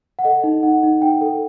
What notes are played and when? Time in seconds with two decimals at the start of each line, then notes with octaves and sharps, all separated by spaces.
0.19 F#5
0.24 A4 D#5
0.44 D#4
0.63 D#4 F#5
0.83 D#4
1.02 D#4 G5
1.21 A4